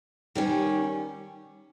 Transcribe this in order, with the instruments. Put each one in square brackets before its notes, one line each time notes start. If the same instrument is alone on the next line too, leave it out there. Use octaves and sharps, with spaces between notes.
[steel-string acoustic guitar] D#3 G3 C#4